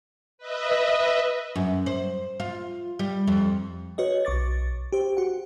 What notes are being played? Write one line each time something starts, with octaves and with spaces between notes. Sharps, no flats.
B4 D#5 E5
F#2
C5
F4
G3
F2
F#4 B4 C#5 D#5
B1 C#6 D6 A6
G4 C5
F#4 F#5